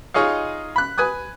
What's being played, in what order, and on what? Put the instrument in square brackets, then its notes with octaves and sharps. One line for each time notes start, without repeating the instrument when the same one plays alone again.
[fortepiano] D#4 F4 G#4 C#5 D#5 F5
B5 F#6
B4 G#5 D#6 F#6